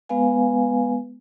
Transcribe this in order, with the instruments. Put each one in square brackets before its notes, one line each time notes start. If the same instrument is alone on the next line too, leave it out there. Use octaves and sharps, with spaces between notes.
[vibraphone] G#3 B3 B4 F5 G#5